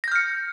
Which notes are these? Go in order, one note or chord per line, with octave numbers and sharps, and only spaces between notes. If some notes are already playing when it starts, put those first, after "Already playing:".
F6 G6 A#6 C#7